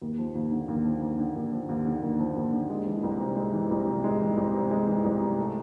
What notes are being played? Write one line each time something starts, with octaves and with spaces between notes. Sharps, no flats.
D#2
F3
D#2
D3
D#2
F3
D#2
D3
D#2
F3
D#2
D3
D#2
F3
D#2
D3
G#3
E3
C2
C3
G#3
E3
C2
C3
G#3
E3
C2
C3
G#3
E3
C2
C3
A3